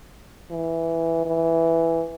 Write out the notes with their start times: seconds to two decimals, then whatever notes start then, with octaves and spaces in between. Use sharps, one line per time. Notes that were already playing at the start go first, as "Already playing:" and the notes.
0.51 E3
1.26 E3